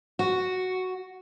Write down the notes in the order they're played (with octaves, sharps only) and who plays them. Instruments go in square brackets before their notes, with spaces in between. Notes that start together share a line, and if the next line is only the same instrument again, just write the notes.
[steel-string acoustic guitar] F#4